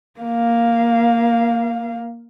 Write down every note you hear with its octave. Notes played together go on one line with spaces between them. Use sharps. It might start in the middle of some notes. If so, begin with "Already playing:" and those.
A#3 F5